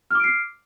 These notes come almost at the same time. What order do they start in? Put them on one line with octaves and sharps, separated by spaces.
F6 D6 D7 C7